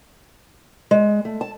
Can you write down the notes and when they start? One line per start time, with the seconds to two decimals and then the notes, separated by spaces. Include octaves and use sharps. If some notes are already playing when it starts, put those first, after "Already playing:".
0.91 G#3
1.25 A3
1.41 A5